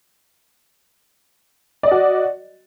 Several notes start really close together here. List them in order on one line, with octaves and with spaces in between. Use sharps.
D5 D#5 F#4